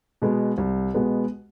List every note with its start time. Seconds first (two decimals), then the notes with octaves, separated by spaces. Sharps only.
0.22 B2 G#3 B3
0.58 C2
0.94 B2 G#3 B3